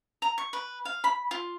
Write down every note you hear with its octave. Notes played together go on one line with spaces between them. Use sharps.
A#5
C#6
B4
F5
B5
F4